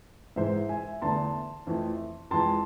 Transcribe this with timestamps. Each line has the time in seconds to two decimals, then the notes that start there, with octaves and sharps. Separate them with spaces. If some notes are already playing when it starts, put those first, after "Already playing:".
0.36 G#2 E3 G#3 C5 E5
0.69 E5 G#5
1.02 E2 D3 A3 A5 C6
1.67 F2 E3 A3
2.31 F2 E3 G#3 A5 C6